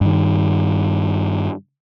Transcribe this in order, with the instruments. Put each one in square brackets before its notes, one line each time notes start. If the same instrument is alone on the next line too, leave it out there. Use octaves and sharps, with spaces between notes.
[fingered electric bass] G2 D#3